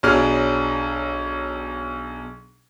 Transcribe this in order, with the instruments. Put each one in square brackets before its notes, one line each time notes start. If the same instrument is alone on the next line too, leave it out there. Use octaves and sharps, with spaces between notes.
[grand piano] B1 B2 F#3 D4 G#4 F6